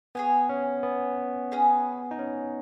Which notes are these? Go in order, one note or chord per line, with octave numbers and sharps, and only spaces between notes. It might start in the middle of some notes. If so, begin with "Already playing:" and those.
B3 G#4 C#5 G#5
C#4
B3
C#4 G#4 B4 D#5
D#4
C#4